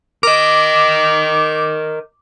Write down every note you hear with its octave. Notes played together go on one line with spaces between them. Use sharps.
A#4 D#5 D6